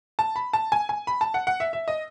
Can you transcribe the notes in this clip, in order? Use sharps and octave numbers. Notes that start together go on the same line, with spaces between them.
A5
B5
A5
G#5
G#5
B5
A5
F#5
F#5
E5
E5
D#5